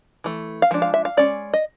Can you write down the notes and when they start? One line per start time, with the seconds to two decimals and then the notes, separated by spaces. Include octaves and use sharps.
0.24 E3 A3
0.62 F5
0.71 F3 G#3 D4
0.82 F5
0.94 E5
1.05 F5
1.17 G#3 C#4 D5
1.54 D#5